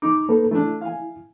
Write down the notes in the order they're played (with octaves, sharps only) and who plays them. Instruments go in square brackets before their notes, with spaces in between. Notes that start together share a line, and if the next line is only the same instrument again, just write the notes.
[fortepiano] D#4 [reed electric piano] D6
[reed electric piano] A#3 A4 B4
[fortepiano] A3 D4 [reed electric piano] E4
[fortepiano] F5 G#5